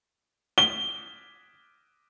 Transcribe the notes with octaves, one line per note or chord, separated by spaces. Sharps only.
G7